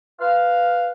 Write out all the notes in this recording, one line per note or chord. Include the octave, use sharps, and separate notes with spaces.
B4 F5